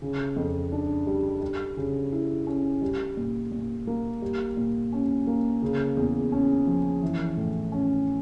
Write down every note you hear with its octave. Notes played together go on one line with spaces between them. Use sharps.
C#3
F2
D4
G3
G3
C#3
E4
C#4
G3
A#2
A#2
A#3
G3
A#2
C#4
A#3
C#3
E2
C#4
F3
E3
A2
C#4